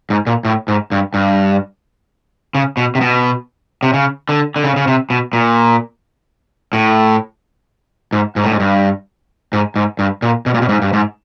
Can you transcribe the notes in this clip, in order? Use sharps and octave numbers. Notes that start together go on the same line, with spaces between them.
G#2
A#2
A2
G#2
G2
G2
C#3
B2
C3
B2
C3
C#3
D3
D3
C#3
C#3
C3
B2
A#2
A2
G#2
G#2
A2
G#2
G2
G#2
G#2
G2
A#2
B2
A#2
B2
G#2
G2
G#2